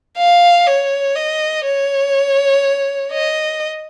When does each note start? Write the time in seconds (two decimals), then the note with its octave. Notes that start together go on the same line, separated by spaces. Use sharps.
0.18 F5
0.67 C#5
1.16 D#5
1.65 C#5
3.12 D#5